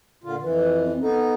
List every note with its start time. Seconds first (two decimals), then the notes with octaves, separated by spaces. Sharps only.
0.24 A#2 D3 F4
0.42 F2 E3 B4
0.85 C4
1.01 B3 D#4 A4